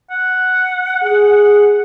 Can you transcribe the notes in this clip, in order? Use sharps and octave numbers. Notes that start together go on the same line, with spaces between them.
F#5
G#4